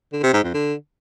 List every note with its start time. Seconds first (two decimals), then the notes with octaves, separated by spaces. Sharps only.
0.13 D3
0.23 C3
0.33 G#2
0.44 F2
0.54 D3